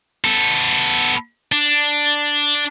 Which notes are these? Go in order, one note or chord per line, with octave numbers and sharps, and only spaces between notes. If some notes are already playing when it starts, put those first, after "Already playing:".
B3 A4
D4